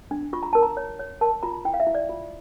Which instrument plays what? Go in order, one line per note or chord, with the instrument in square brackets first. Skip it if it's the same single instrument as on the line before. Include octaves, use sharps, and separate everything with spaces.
[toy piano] D4
F4 C#6
A#5
A#4 A5
A#5
C#5
C#5
A#4 A5
F4 A#5
E4 G5
F5
E5
E4
D5
F4